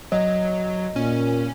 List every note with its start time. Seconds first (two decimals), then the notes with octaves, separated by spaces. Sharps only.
0.12 F#3 D#5
0.96 A#2 C#4